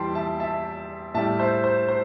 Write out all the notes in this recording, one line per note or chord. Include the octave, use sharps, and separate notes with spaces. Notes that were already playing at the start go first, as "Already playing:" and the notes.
Already playing: E2 E3 G3 G5 A5 C6
E5 A5
E5 A5
A2 G3 E5 A5
C5 E5
C5
C5